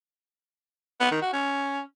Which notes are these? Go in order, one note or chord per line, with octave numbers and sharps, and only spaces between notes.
B3
D#3
F#4
C#4